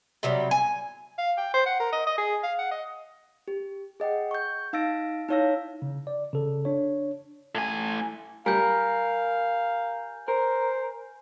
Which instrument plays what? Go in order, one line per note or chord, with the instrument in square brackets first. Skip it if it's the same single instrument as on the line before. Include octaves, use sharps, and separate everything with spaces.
[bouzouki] C3 F#3 G3
G#5
[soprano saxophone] F5
G5
C5
F#5
A#4
D#5
D#5
G#4
F5
F#5
D#5
[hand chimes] G4
G#4 D#5 F#5 G5
C#6 G6
D#4 F5 E6 A6 A#6 D7
D#4 E4 C#5 F5 E6 A#6
[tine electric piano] C#3
D5
C#3 A4
D4 C#5
[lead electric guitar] A2 G#5
[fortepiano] G3 [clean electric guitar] A#4 [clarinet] F5 [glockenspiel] G#5 G6
[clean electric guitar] A#4 [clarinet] C5